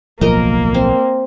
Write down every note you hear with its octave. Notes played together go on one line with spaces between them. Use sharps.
D1 B1 F3 A#3 A#4 D#5 A#5
C4